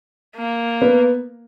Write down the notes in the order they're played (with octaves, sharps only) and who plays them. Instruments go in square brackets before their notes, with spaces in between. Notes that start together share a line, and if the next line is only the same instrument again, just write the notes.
[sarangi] A#3
[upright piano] B3